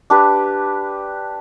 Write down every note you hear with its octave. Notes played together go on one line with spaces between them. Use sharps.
D4 G4 B4